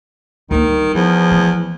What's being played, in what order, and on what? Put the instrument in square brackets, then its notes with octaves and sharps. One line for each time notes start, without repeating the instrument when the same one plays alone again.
[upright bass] D2 A#3 [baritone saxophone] D#3
[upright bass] G3
[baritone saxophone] E2 [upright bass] E3 [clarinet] F3
[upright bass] E3 A3